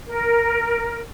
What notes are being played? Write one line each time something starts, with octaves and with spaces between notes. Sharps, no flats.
A#4